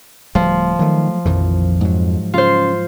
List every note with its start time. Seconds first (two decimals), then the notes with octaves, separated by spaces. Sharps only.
0.35 D1 F3 G3 A3
0.79 D#3 F#3 A3
1.25 A#1 F2 D#3 E3
1.81 G#2 F#3
2.34 C#3 F4 C5